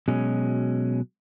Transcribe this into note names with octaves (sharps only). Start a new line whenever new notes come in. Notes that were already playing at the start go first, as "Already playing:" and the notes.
B2 F#3 G#3 C#4